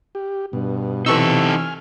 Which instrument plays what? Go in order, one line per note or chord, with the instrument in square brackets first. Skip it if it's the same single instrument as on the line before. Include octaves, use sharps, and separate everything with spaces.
[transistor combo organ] G4
[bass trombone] G2 [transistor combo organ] B2
[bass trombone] C3 [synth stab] E3 C#6 E6 [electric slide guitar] D#4 A4
[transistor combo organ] G#5 F6